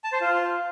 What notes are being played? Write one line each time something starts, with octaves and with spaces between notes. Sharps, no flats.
A5
C5
F4